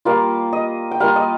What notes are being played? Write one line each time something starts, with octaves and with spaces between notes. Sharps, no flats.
G3 A#3 F4 F5
D#5
G5
G3 A#3 F4 F5
D#5